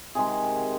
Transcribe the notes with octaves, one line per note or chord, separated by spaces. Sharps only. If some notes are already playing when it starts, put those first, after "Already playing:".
C3 D#3 G#3 G#4